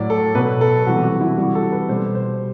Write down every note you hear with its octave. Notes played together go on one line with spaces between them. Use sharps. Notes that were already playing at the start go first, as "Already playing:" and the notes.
Already playing: A2 F#3 D5
A4
B2 F#3 B4
A4
C3 E3 G3 F#4
F#4
E4
C3 E3 G3 F#4
A4
B4
B2 G3 C5
C5